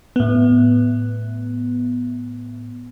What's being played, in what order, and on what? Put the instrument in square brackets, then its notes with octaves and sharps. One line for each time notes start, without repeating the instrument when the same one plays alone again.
[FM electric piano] A2 B3